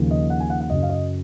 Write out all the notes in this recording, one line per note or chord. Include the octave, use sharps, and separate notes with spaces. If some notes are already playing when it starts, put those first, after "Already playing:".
Already playing: D#2 C#3 F3 A#3
D#5
F#5
G#5
F#5
F#5
F#2 C#3 F#3 C#4 D#5
F5
D#5